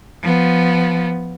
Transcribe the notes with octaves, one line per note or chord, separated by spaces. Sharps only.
F3 B3